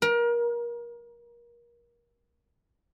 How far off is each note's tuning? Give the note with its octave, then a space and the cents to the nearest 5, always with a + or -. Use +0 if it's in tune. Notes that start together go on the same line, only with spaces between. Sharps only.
A#4 +30